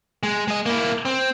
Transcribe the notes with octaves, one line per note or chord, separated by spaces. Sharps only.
G#3
G#3 D#5
A#3 E4
C4